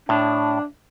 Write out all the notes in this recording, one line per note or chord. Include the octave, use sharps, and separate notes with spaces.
A2 D4